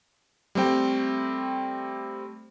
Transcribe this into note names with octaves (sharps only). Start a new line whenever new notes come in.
G3 A3 C4 G5